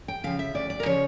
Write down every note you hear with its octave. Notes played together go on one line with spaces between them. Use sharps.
G5
C#3 F3 F5
E5
D2 D5
D5
A#4
C#3 F3 C#5